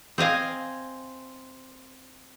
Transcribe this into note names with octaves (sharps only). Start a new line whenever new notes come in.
C4 D#5 F5 G#5